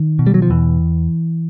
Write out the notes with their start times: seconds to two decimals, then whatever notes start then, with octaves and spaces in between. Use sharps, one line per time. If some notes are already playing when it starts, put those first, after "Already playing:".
Already playing: D#3
0.19 B2
0.27 G3
0.34 F#3
0.42 F3
0.50 E2 E3